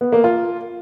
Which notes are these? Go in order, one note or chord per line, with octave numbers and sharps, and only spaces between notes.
B3
A#3
F4